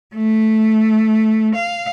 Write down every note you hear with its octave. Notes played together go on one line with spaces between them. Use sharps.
A3
F5